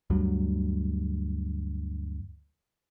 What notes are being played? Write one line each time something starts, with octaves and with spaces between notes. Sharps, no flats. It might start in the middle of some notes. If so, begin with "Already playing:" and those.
D2 G2 D3 F#3